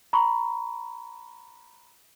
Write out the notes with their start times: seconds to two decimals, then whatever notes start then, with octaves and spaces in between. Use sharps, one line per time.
0.13 A#5 B5 C#6